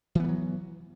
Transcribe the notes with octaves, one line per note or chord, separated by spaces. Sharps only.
E3 F#3 G3 B3